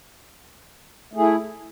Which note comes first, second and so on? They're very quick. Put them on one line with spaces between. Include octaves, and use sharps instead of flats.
A3 G#4 E4